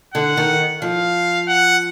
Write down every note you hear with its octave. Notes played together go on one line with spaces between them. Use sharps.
D3 F#5
D#3
F3 F5
F#5